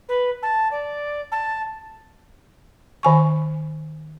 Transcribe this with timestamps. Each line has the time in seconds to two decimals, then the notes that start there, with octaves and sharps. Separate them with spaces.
0.08 B4
0.42 A5
0.71 D5
1.31 A5
3.03 D#3 G#5 C#6